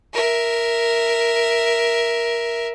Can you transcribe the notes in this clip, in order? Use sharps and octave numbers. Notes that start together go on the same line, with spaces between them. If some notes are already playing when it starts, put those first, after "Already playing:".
A#4 E5